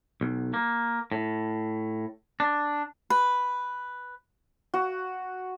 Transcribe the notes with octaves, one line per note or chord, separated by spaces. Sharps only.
B1
A#3
A2
D4
B4
F#4